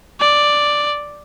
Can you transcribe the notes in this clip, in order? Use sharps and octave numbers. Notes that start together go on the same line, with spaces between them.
D5